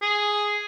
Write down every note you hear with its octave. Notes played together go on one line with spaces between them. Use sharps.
G#4